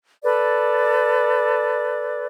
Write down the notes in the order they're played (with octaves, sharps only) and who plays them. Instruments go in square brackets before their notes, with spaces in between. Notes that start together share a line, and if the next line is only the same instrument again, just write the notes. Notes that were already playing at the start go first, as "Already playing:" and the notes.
[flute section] A4 B4 D5